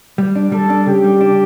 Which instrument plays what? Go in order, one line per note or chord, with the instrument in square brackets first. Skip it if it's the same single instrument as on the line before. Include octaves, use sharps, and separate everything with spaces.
[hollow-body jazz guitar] G3
D4
[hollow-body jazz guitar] G3 [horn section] A4
[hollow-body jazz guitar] D4
[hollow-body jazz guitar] C#3 [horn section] G4
[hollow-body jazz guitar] G3
D4